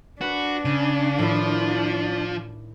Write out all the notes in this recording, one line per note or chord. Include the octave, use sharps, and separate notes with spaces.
D4 F#4 B4
C#3 D#7
A2 D#3 F3 E4